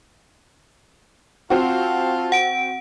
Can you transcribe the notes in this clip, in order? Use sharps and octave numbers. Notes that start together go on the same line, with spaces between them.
C4 F4 F#4 A5
F#5 D7